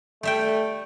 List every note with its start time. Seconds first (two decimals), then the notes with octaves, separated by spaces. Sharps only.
0.23 G3 A3 E5 G5